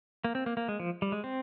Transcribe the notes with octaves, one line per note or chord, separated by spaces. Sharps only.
A#3
C4
A#3
A#3
G#3
F3
G3
G#3
C4